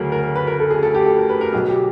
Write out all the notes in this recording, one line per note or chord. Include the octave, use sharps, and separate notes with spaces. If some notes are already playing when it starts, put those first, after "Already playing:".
Already playing: D2 C#3 F#3 A#4
A#4
B4
A#4
A4
G#4
A4
G4
A4
A#4
B4
A#4
B1 B2 F#3 G#4
G4